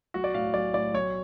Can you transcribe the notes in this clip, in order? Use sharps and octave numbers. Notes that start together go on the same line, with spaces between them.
B1 F#4
D5
A2 F5
B1 D5
A2 D5
B1 C#5